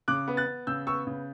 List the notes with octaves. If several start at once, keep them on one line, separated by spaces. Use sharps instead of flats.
C#3 D6 F#6
B3
F#6 A6
B3
C#3 E6 G6
B3 C#6 E6
C#3